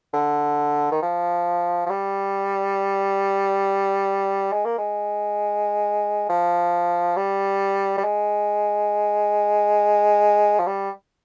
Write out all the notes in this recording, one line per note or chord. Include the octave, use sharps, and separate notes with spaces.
D3
D#3
F3
F3
G3
G#3
A#3
G#3
F3
G3
G3
G#3
F3
G3